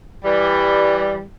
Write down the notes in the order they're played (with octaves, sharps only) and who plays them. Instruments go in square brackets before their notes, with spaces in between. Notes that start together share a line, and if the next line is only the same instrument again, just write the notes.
[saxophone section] E3 G3